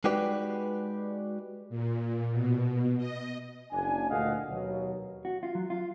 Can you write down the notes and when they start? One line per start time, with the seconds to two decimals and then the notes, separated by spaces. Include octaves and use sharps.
0.04 G#3 D#4 F#4 G4 B4 D5
1.69 A#2
2.31 B2
2.97 D#5
3.72 F#1 D4 G#5
4.09 D2 A#2 G#4 D#5 F5 F#5
4.48 D#2 B2 F#3
5.25 F#4
5.43 F4
5.55 F#3
5.70 F4